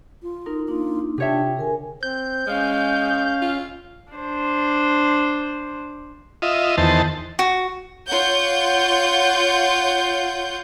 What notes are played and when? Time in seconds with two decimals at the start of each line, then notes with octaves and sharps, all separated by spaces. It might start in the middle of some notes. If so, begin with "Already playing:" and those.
0.23 F4
0.46 D#4 A#4
0.68 A#3 D4 D#4 F4
1.18 C3 D4 F4 G4 C#5 E5 G5
1.57 D3 G#4 A#4 G#5
2.03 C4 G6
2.47 G#3 C#4 F5
3.42 F4
4.12 D4 C5
6.42 F4 D#5 E5
6.77 E2 D#3 C5 A5
7.39 F#4
8.06 F4 C#5 F#5 G6